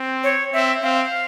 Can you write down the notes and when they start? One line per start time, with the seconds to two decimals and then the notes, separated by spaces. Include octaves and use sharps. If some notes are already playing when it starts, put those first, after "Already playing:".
Already playing: C4
0.24 C#5
0.53 C4 E5
0.83 C4 F5